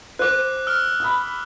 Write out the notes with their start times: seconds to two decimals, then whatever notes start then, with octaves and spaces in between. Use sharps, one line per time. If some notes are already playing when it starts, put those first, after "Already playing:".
0.19 C5 D6 F#6
0.67 E6 F6 G7
1.00 B5 D#6